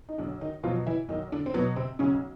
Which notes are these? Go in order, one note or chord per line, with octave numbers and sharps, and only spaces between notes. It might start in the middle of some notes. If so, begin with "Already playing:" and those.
D#4
B1 D3 D4
D#3 D#4
B2 F3 F#3 F4
E3 E4
B1 D#3 D#4
D3 D4
C4
B2 F#3 B3
C3 C4
B1 C#3 C#4